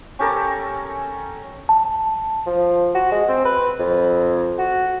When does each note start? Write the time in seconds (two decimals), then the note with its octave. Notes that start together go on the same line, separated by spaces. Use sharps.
0.19 C#4 G4 A4 A#4
1.69 A5
2.46 F3
2.95 F#4
3.12 G#3
3.28 C4
3.45 B4
3.79 F2
4.58 F#4